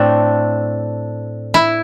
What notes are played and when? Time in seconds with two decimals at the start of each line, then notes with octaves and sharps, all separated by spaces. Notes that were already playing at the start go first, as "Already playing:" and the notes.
Already playing: A2 A3 C4 D4
1.54 E4